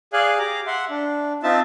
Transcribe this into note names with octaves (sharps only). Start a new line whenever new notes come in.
G#4 D5 F5 G#5 F#6
G4 A#5 D6
E5 F#5 C6
D4
C4 D#4 F4 E5 A5